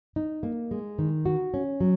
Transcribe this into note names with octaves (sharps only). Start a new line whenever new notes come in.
D#4
A#3
G#3
D#3
F#4
C#4
F#3